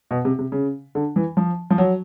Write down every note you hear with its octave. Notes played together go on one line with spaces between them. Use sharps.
B2
C3
C3
C#3
D3
E3
F3
F3
F#3